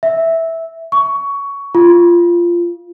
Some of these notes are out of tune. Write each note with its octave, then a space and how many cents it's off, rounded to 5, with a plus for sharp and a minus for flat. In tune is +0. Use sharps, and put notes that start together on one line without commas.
E5 -10
C#6 +15
F4 -15